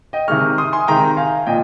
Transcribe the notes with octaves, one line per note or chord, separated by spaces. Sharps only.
D#5 G5
C3 D#3 G#3 C#6 F6
C6 D#6
G#5 C6
C3 D#3 G#3 G5 A#5
F5 G#5
A#2 F3 D#5 G5